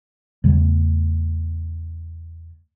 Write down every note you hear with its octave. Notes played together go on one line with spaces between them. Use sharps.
E2 C#3 G3 A3